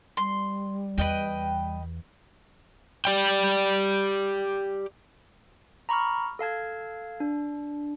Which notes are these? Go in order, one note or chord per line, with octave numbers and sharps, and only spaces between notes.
G3 C6
E2 B4 D#5 G5
G4 D5 G5
A#5 B5 C#6 D6 F6
A4 F5 A5 G#6
D4